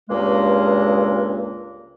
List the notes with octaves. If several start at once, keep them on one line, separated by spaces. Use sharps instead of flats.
C#2 G2 A#2 G#3 A#3